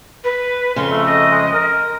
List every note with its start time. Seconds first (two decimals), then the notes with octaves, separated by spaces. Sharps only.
0.24 B4
0.76 F2 C#3 C6
0.91 A3
1.06 D#5
1.31 G#3
1.54 A#4